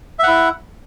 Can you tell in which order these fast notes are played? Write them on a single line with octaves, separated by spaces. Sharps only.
E5 F#5 E4